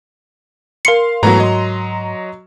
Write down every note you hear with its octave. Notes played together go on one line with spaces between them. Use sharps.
A#4 F5 C6 C7 C#7
G#2 E3 F#3 A3 B3 A#5
D#5 C6